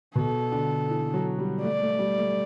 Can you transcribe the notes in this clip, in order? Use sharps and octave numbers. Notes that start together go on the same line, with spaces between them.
B2 A4
D3
E3
F#3
G3
A3 D5
A3
G3
A3